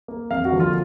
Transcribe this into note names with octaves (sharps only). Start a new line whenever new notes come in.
A#3
F2 F5
F#4
D3 F3 A#3
F4